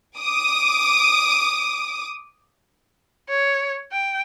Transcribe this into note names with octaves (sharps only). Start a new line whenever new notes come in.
D6 D#6
C#5
G5